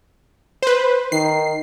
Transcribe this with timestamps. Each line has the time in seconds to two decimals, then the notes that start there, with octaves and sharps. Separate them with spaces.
0.62 B4 C5
1.12 D#3 C7